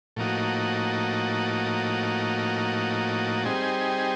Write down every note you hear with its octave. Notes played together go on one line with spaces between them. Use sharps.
A2 F3 A#3 D#4 F#4
G3 C4 D#4 G#4